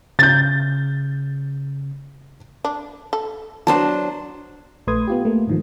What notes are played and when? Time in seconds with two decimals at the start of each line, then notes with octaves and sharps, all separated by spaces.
0.19 C#3 G6 A6
2.65 D4
3.13 A4
3.67 F#3 B3 D4 C5 A5
4.87 A#1 A3 B4 C6 D#6 G#6
5.08 B3 F4 G4
5.25 A3 A#3
5.47 G#2 D#3 F3